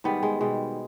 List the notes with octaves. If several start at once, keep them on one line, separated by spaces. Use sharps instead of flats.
G#2 D#3 G3 B3
G#3
B2 G3 G#3